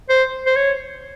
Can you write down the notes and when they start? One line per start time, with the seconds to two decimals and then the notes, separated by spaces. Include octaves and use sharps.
0.09 C5
0.46 C5
0.56 C#5